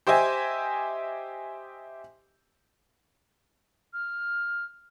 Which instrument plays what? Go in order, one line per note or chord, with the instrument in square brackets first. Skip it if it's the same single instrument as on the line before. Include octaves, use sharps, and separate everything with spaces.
[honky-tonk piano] G4 C5 D#5 E5 G#5
[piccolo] F6